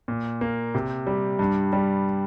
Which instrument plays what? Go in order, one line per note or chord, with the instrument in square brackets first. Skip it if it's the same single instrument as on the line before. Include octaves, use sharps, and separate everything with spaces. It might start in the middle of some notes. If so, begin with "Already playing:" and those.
[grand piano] A#2
A#3
C3
G3
G2
G3